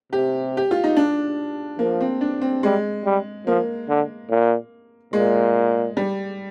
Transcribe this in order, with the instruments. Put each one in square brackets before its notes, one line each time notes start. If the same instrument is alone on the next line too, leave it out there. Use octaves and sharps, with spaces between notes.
[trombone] C3 [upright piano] G4
[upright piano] G4
F4
D#4
D4
[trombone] F3 [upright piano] A#3
[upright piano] C4
D4
C4
[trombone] G3 [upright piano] G#3
[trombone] G3
[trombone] F3 [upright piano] A#3
[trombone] D3
A#2
[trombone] A#2 [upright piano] G#3
[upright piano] G3